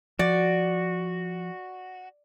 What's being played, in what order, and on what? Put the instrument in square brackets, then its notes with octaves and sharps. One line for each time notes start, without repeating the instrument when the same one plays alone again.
[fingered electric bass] F3 [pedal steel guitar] F#4 [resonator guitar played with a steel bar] D5